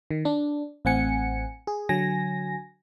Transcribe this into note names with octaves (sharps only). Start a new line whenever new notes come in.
D#3
D4
A1 A2 C4 F#5 G#5 C#7
G#4
D3 F#3 G#5 A#6